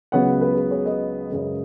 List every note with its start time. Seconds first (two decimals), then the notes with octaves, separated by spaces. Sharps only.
0.12 C#2 C#3 F#3 B3 C#5 F#5
0.41 B4
0.57 G#4
0.71 G#4 C#5
0.86 B4 D#5
1.30 F#2 C#3 G#3